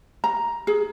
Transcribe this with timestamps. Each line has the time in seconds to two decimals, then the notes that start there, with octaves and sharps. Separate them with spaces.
0.24 A#5
0.67 G#4